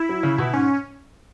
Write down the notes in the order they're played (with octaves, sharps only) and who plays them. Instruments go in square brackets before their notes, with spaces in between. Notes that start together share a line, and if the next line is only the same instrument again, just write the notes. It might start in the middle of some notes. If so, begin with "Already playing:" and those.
Already playing: [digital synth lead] E4
[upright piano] F#3
C#3
B2
[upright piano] G#2 [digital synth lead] C#4